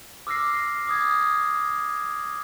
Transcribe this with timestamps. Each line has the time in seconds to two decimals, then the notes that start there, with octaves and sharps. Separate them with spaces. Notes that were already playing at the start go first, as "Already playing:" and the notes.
0.27 D6 E6 F6 A#6 C7
0.87 D6 D#6 G#6